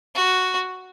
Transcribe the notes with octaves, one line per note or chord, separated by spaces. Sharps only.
F#4